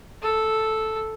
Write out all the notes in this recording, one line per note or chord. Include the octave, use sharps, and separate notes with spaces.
A4